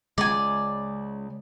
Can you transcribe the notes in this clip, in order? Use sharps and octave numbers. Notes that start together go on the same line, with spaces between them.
C#3 G#3 D5 G#5